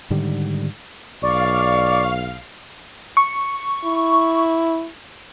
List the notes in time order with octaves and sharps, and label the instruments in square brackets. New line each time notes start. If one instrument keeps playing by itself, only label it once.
[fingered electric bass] G#2 D3 D#3 G3
[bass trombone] B1 [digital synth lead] D5 [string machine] F5 [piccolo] C#6
[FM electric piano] C#6
[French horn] E4